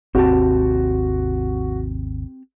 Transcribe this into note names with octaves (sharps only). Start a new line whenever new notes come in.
G#1 D#2 C3 C4 F#4 G4 A5